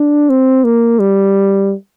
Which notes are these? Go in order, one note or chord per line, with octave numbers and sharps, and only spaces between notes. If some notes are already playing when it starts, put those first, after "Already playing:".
Already playing: D4
C4
A#3
G3